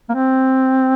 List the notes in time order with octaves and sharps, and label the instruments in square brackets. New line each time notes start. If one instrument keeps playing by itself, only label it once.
[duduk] A#3
C4